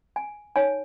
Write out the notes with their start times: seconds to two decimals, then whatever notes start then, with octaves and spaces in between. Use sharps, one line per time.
0.16 G#5
0.56 D#4 C#5 G#5